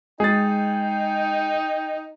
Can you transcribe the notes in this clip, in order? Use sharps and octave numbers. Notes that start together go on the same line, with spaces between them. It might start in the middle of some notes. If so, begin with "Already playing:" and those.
G#3 D#4 G#4 G5 A6